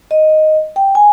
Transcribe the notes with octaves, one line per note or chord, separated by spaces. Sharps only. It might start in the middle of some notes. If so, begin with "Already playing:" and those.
D#5
G5
G#5